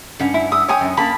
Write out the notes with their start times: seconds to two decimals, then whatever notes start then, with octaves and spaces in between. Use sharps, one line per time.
0.20 G2 C#4 F#5
0.34 E4
0.52 D#6 E6
0.68 C#5 G5 G#5 D#6
0.81 F#2
0.97 A#3 C#4 A5 B5